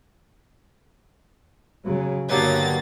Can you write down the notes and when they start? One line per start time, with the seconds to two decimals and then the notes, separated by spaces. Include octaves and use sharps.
1.85 C#3 F#3
2.30 G2 D3 F#3 G3 A#3 B3 A6